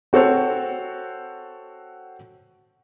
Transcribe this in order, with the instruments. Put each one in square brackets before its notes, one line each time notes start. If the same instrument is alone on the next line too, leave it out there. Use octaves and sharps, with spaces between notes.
[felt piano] C4 F#4 A4 C5 C#5